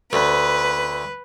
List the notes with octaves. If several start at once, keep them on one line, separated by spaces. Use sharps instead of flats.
D2 B4